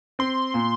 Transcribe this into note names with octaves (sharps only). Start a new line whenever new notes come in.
C4 C6
A#2